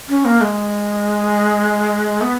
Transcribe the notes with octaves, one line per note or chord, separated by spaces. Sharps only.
C#4
A#3
G#3
B3